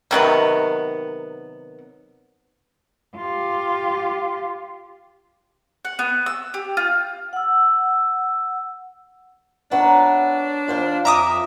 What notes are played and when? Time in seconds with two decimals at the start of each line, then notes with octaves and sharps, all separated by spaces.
0.11 C3 D#3 F#3 B3
3.17 F4 G4
5.85 F#5
5.99 B3
6.26 E6
6.54 G4
6.77 F4
7.33 F#5 E6
9.71 B3 D4 A#4 B4 C#5 E5 F#5
10.68 D#3 F4 C5 F5
11.05 F2 E5 A#5 D6 D#6